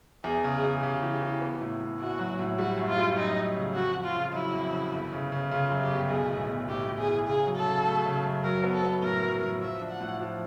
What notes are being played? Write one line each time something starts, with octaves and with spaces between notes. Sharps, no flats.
E2 G#4
C#3
G#4
E2
C#3 G4
E3
E3
B3
A2
A2
A#1 F#4
F#3
A2
G3 F#4
F#2
F4
G3
F#2 D#4
F#2
C#3
F2 F#4
F2
F4
C#3
F#3 E4
F2
C#3
G1
C#3
C#3
C#3 F4
F#2
G4
G1
B1 G#4
A2
B1
A2 G4
A2
G#4
E3
C#3 G#4
F#3
A4
C#3
A3
C#3
F#2
F#3 A#4
B3
A4
B3
A2 A#4
F#3
A2
F3 E5
D4
F#5
A2
F3